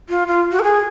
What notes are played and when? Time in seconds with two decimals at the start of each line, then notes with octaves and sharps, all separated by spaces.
0.09 F4
0.28 F4
0.52 F#4
0.60 A#4
0.64 G#4